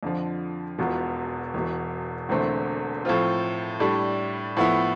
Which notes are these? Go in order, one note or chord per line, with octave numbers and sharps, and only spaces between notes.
F2 D3 F3
E1 E2 B2 B3 F4
E1 E2 B2
E1 E2 D3 A3 C4
A2 F3 C4 F4
A2 G3 D4
A2 F3 B3 E4